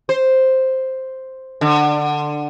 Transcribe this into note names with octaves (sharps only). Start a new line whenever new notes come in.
C5
D3